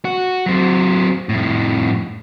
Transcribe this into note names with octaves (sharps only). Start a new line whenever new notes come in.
F#4
F#3 C4
F2 A2